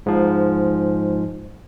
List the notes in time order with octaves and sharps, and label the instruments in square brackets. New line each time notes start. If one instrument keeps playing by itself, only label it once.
[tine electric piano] G#2 F3